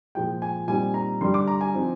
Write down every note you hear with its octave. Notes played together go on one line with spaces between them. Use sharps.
A#2 F3 G#3 G5
G#5
A#2 G3 C4 D#4 G#5
A#5
D3 G3 D4 C6
D6
A#5
G#5
F3 C4 D#4